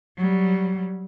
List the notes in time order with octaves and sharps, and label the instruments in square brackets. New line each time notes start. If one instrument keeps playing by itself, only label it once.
[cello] F#3 G3